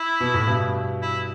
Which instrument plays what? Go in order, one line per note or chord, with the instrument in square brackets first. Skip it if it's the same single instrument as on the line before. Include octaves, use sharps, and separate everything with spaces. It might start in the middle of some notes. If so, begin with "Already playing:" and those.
Already playing: [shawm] E4
[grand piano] B2
A2
G2 B2
[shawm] E4